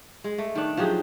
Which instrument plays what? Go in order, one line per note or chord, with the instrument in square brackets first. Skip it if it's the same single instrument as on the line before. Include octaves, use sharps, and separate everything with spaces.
[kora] G#3
A3
D#3 D4
F3 F#3 G4 G#4